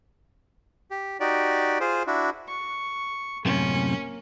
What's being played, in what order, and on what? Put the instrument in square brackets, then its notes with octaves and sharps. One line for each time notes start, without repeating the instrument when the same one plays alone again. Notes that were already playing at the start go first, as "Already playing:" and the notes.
[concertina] G4
D#4 F#4 G4 D5
F4 G#4 C5
D4 E4 F#4
[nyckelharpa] C#6
[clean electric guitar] F#2 A2 C3 [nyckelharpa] A#3 [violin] C#4